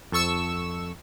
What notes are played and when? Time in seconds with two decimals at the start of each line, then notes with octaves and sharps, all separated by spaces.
0.12 F2 A4 C#6 E6 E7